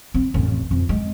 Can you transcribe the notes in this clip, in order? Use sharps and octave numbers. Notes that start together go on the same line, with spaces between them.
C4
A1 F2
F2
G#3